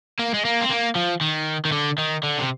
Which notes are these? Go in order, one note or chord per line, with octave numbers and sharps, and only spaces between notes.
A#3
G#3
A#3
C4
A#3
F3
D#3
D#3
D3
D#3
D3
C3